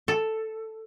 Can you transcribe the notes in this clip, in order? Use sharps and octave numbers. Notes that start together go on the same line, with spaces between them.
A4